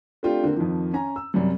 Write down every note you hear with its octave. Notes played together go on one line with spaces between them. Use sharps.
A3 C4 D4 F4 G4
D3 A#3 C4
F2 D#3 F3
C#4 G#5 A#5
E6
F#2 C3 F#3 G3